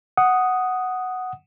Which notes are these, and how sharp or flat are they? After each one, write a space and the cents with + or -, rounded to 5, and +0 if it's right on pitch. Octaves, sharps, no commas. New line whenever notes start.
F#5 +0 D#6 +0